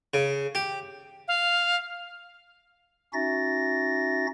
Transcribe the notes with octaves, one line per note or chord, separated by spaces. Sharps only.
C#3
G4
F5
C#4 D#4 F#4 E5 A6 A#6